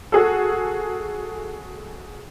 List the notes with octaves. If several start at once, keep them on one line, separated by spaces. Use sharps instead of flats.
F#4 G#4 A4